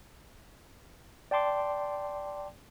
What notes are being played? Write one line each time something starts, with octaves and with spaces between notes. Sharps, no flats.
D5 G5 A5 C6 D6